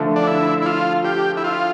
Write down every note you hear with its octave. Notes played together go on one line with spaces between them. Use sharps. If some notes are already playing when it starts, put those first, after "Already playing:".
Already playing: D3 F3 A3
D4
E4
E4
F4
G4
E4
F4